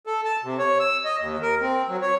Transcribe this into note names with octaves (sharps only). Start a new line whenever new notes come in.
A4
A5
C3
C#5
E6
D#5
D#2
A#4
C4
F#3
C#5